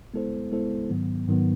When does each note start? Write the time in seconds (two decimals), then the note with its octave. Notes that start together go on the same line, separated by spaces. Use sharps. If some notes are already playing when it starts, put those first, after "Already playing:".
0.14 G#3 B3 E4 A4 C5
0.51 G#3 B3 E4 A4 C5
0.90 G#2 D#3 F#3 B3
1.28 G#2 D#3 F#3 B3